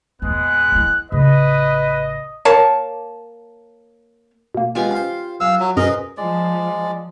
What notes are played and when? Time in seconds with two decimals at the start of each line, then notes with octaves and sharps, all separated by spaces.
0.22 E2 A#2 G#3 B3 F#6
0.72 D#4 E4
1.12 A1 C#3 B4 D#5
2.45 A#3 C#5 A5
4.55 B2 A#3
4.75 G#3 B3 C#4 F4 G4 G#5
4.91 C#4 C5 F5
5.40 F#2 F5 E6
5.60 F#3
5.77 F#2 B2 C4 G#4 A#4 B4 D#5
6.17 F3 G#3 D5